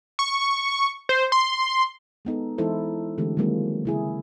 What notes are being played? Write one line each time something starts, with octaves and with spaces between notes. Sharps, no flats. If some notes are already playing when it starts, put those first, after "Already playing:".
C#6
C5
C6
G#3 B3 D#4 A4
E3 G#3 D#4 E4 A4 C5
D3 E3 G#3 A3 C4 G4
D#3 F#3 G#3 A#3 C4
C#3 E4 G#4